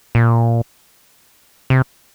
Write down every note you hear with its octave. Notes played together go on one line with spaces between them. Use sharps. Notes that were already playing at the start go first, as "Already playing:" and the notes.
A#2
C3